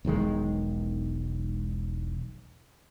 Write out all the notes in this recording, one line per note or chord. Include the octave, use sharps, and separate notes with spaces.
E1 B1 D#3 G#3